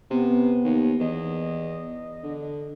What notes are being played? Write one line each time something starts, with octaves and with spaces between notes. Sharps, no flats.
C3 B3
D#2
E2 D#5
D3